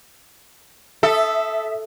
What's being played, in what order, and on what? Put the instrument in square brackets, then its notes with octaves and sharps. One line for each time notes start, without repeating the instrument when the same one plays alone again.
[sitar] A4 [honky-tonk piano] E5 D#6 E6